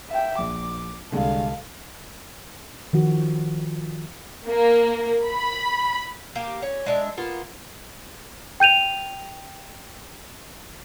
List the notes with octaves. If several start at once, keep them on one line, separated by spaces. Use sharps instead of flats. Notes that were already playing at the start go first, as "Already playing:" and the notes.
E5 G5
A#1 D6
C2 D3 G#3 A4 F5
D#3 F3 F#4
A#3
B5
A#3 G4
C#4
G#3 D4 E5
A#3 B3 F4
G5 G6 D#7 F7